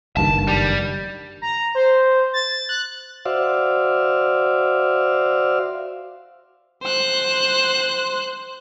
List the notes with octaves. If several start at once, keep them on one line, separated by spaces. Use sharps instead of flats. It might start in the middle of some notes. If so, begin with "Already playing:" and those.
F#1 G2 D#3 A5
G3
A#5
C5
A6
F#6
F#4 C5 D5 E5 F5
C5 F#6